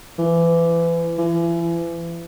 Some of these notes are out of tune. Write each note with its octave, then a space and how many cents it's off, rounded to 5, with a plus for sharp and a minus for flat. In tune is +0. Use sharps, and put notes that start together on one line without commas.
E3 +30
E3 +40